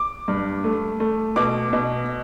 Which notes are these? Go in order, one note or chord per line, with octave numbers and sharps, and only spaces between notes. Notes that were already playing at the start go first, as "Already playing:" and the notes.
Already playing: D6
G2
A3
A3
B2 D6
B2